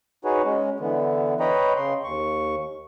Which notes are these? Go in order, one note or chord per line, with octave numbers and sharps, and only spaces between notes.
D#4 F#4 G#4 B4 C#5
G#3 C#4
D3 E3 B3
B4 C#5 D#5 G5 A#5 B5
C#3 C6
D#2 C#6